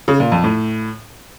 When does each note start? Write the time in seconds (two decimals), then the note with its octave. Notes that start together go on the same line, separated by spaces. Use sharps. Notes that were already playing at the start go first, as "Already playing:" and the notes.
0.08 C#3
0.20 A#2
0.32 F2
0.44 A2